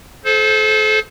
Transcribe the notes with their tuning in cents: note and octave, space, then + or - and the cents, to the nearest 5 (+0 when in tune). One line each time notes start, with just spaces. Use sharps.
A4 -35 C5 +0